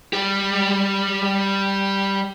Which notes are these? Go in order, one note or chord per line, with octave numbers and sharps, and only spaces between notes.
G3 G4